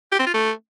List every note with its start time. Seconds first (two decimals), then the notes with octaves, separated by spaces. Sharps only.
0.12 G4
0.19 C4
0.27 F4
0.34 A3